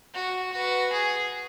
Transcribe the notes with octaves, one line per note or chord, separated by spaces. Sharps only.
F#4
F#4 B4
G#4